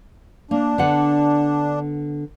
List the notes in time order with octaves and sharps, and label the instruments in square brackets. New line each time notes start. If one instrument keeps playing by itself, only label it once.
[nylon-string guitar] A#3 [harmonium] D4
[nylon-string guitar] D3 B3 F#5